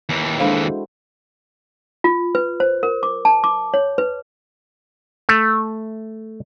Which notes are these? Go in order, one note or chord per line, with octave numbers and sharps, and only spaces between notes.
D#2 E3
G#3 D4 A4 C5 F5
E4 F#4
F4
B4
C5
A#4
D6
A5
D6
C#5
B4
A3